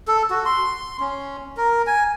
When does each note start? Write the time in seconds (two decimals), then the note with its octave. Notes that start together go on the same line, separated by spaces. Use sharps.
0.08 A4
0.30 F#4
0.45 C6
1.00 C#4
1.57 A#4
1.87 G#5